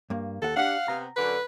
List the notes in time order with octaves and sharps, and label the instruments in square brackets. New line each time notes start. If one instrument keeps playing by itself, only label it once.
[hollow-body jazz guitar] G2 A#3
[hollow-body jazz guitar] D#2 F#5 [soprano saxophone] A4
[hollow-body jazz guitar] D4 G4 [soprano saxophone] F5 [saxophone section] F#5
[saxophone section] C3 B3 [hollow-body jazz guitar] A#5
[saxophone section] F#2 D3 [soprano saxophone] B4